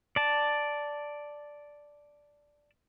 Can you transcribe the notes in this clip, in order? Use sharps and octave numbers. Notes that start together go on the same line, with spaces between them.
D5 A5